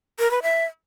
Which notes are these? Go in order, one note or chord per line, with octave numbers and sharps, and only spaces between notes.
A#4
B4
E5